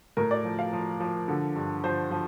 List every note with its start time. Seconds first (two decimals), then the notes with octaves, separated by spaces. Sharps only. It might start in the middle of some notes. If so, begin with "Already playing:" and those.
0.17 A2 A#4
0.31 D5
0.45 F3
0.59 F5
0.73 F3
1.00 F3
1.28 D3
1.56 G2
1.84 F3 C5
2.11 F3